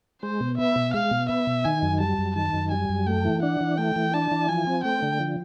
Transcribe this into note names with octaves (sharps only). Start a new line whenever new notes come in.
G#3 C5
B2
B3 E5
B2
G#3 F5
B2
B3 E5
B2
D#3 G#5
F#2
G3 A5
F#2
D#3 A5
F#2
G3 G#5
F#2
A3 G5
E3
D4 F#5
E3
A3 G5
E3
D4 A5
E3
F3 G#5
C4
A3 G5
D3
F3